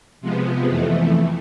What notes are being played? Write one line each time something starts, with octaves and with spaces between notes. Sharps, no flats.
C3 F3 G#3 B3
F2 E3 A3